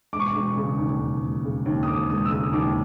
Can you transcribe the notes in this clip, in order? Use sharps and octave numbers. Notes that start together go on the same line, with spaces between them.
E1 D6
C#6
D6
E1
C#3
D#2
E1
E1
C#3
D#2
D#6
E1 D6
E1 D#6
E6
C#3 D#6
D#2 D6